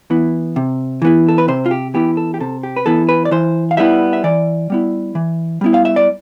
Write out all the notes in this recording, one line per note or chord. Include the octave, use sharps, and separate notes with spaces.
E3 B3 E4
C3
E3 B3 E4
A4
B4
C3 C5
F4
G4
E3 B3 E4 G4
A4
G4
C3 A4
G4
B4
E3 B3 E4 A4
B4
D5
E3 C5
F5
G3 B3 E4 E5
E5
E3 D5
G3 B3 E4
E3
G3 B3 E4
F5
E5
D5